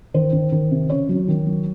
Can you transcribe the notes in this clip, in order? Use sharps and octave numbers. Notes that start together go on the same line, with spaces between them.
D#3 C5
D#3
D#3
C3
C#3 C#5
F#3
D#3
F#3